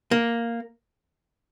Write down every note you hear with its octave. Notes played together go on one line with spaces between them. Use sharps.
A#3